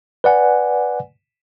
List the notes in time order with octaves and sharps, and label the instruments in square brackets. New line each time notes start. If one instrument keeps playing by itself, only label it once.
[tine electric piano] B4 D5 F#5 G#5